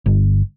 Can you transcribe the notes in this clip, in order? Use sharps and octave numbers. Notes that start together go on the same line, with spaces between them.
G1